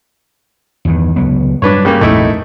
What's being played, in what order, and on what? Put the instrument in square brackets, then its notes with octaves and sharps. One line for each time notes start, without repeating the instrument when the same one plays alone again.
[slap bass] E2 G2 D#3
C#2 F#3 B3
[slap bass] G2 F#3 [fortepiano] D4 B4 C#5
[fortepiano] C#3 G3 A#3
[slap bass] A#1 F2 G#2 [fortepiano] A3 D#4 E4